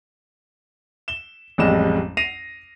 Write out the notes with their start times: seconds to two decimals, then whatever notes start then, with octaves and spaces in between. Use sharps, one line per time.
1.08 E7 G7
1.58 A1 F2 G3 G#3 D#5 E7
2.17 A#6 C7 D#7 F7